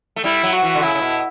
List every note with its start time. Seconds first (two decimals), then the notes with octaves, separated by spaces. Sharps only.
0.16 A3
0.24 G3 E4
0.43 F#3
0.53 F#4
0.63 E3
0.75 D3
0.82 C#3 E4
0.95 C#3
1.02 B2